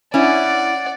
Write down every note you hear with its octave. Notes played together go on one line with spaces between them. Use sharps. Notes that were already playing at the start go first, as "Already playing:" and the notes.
C#4 E4 D5 F#5